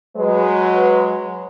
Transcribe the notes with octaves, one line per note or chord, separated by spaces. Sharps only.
F#3 G#3 B4